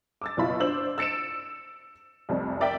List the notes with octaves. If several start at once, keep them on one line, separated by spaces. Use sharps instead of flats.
D6 E6 A6
F#1 B2 E4 F4 B5
D4 C5 E6 F#7
E6 A6 C#7 D7 E7
F1 C2 F2
A#4 D5 E5 G5